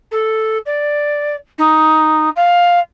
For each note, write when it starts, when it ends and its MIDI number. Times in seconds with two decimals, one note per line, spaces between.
0.11 0.58 69
0.65 1.35 74
1.58 2.29 63
2.36 2.79 77